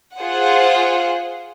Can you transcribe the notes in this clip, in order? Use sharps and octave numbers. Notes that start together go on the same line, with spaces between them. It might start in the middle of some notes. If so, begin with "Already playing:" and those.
F4 G#4 C5 F#5